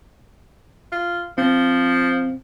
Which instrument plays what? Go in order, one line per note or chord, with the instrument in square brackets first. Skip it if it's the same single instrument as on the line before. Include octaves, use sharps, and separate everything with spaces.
[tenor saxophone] F4
[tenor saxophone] F3 [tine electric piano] C4